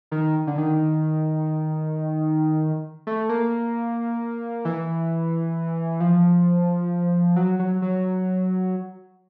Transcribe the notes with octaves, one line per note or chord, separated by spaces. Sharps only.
D#3
D3
D#3
A3
A#3
E3
F3
F#3
F#3
F#3